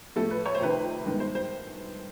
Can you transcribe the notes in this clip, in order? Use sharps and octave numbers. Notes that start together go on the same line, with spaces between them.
A2 F3 A3 A4
B4
C#5
C5
F2 C3 D#3 B4
C5
G2 D#3 G#3 B3
C5
C5